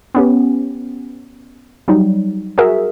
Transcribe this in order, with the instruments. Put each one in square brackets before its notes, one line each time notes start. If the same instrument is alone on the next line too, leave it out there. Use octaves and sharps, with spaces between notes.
[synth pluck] B3 C#4 G4
F#3 G3 D#4
F#4 G#4 A#4 E5